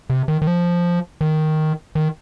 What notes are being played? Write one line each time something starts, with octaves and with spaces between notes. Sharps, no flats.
C3
D#3
D#3
F3
D#3
D#3